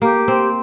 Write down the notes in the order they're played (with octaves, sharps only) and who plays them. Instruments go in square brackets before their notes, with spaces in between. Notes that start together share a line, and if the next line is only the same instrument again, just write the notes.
[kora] A#3 [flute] G4
[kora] C4